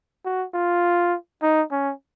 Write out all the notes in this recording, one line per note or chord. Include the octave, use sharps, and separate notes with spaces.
F#4
F4
D#4
C#4